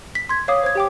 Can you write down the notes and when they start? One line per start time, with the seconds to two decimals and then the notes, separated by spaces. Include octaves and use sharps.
0.15 B6
0.29 C6 G#6
0.48 C#5 F5 D6 D#6
0.63 C5 G#6
0.75 G4 G5 D6